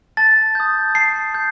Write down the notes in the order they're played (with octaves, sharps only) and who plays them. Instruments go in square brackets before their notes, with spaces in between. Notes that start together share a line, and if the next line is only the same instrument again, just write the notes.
[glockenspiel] A5 A6
D#6 G6
A5 C7
G6